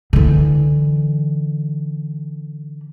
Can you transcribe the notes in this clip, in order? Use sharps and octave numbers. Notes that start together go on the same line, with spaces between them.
D3 E3